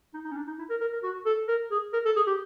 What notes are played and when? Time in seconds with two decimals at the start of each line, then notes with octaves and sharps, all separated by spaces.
0.14 D#4
0.24 D#4
0.31 C#4
0.36 D4
0.47 D#4
0.59 E4
0.70 A#4
0.81 A#4
0.93 A#4
1.03 F#4
1.25 A4
1.48 A#4
1.71 G#4
1.93 A#4
2.05 A4
2.16 G#4
2.27 G4